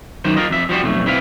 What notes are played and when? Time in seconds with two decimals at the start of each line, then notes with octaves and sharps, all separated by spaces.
0.25 F#2 D#3 C5
0.36 F4 A#4 D#5
0.50 F2 E5
0.69 F3 G3 F#4 C5
0.83 B1 F2 A3
1.06 C4 E4 B4 F5